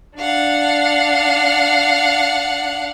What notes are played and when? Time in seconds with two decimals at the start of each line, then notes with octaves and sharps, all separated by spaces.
0.18 D4 F5 F#5